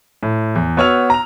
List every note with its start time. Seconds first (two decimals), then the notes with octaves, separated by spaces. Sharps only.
0.23 A2
0.56 E2
0.77 B3 F#4 C#5 E6 F6 F7
1.10 A#5 F7